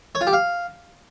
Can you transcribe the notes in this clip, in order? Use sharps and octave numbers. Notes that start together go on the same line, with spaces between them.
C#5
F4
G4
F5